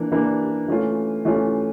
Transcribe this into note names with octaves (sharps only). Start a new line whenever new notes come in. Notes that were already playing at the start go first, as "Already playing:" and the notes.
Already playing: E3 A#3 D4
E3 A#3 D4
E3 A3 C#4 F4
E3 A3 C#4 F4